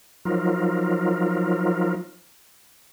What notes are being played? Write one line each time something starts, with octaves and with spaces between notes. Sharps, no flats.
F3 F#3 D#4 F4 A#4